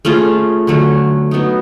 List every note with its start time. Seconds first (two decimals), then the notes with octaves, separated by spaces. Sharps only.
0.05 A3 C#4 F4 G#4
0.67 D3 F#3 A3 C#4
1.31 F#3 B3 D#4